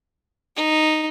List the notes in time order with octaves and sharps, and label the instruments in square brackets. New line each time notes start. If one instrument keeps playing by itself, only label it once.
[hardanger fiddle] D#4